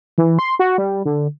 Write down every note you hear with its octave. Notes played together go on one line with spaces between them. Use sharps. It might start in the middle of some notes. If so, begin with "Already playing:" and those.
E3
C6
F#4
G3
D3